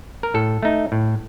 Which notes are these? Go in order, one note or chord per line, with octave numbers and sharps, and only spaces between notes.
A#4
A2 A4
A3 D#4
A2